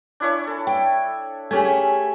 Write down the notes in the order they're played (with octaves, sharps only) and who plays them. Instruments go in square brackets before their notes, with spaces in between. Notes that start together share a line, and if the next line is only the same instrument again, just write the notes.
[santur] D4 E4 C#5
A4
[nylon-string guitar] G5
[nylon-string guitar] A3 G4 G#4 [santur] C#4 G#5